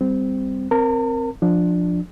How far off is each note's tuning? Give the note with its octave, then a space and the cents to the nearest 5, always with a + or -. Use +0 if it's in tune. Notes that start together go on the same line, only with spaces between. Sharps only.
G3 +10 C4 -15
C4 +0 A#4 +0 A5 +45
F3 +15 D4 +10